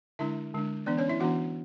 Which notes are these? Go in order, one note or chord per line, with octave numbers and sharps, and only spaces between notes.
D3 G#3 D4 E4 E5
D3 G#3 D4
E3 B3 D4 D5
C#4 C#5
E4 E5
E3 B3 D4 F#4 F#5